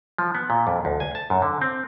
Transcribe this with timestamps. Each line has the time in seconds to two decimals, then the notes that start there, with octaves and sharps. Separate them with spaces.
0.18 F3
0.35 B3
0.50 A#2
0.67 F2
0.85 D2
1.00 G#5
1.15 A5
1.30 F#2
1.42 D3
1.61 C4